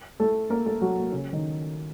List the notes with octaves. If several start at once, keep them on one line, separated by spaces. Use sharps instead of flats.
A3 A4
A#3 A#4
A3 A4
F#3 F#4
A#3
C#3 C#4
D#3 D#4